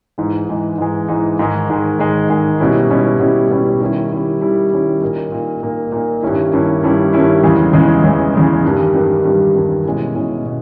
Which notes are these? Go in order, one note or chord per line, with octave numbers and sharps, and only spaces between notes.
G#2 E3 G#3 D#4
G#2 E3 G#3 D#4
G#2 E3 G#3 D#4
G#2 E3 G#3 D#4
G#2 D#3 G#3
G#2 D#3 G#3
G#2 D#3 G#3
G#2 D#3 G#3
B2 G3 C#4 E4
B2 G3 C#4 E4
B2 G3 C#4 E4
B2 G3 C#4 E4
D#3 G3 C#4 E4
D#3 G3 C#4 E4
D#3 G3 C#4 E4
D#3 G3 C#4 E4
A#2 A#3 D#4
A#2 A#3 D#4
A#2 A#3 D#4
A#2 A#3 D#4
G2 D#3 G3 C#4 E4
G2 D#3 G3 C#4 E4
G2 D#3 G3 C#4 E4
G2 D#3 G3 C#4 E4
E2 C#3 E3 G#3
E2 C#3 E3 G#3
E2 C#3 E3 G#3
E2 C#3 E3 G#3
G2 D#3 G3
G2 D#3 G3
G2 D#3 G3
G2 D#3 G3
B2 G#3 C#4 E4
B2 G#3 C#4 E4
B2